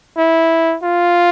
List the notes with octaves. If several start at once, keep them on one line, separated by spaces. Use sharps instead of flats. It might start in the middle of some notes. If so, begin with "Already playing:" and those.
E4
F4